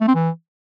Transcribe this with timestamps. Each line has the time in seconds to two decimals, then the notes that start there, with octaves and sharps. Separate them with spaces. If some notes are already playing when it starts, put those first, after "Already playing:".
0.01 A3
0.08 C4
0.15 E3